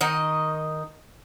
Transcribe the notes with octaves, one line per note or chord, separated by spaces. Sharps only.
D#3 D#4 D#5